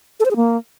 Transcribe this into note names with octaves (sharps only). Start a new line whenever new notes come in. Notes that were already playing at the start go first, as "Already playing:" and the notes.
A4
C5
G#4
A#3